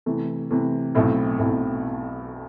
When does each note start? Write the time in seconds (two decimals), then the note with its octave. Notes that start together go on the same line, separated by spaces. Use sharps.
0.06 C3 E3 A3
0.51 C3 E3 A3
0.95 B1 B2 A3 C4 E4
1.39 B1 B2 A3 C4 E4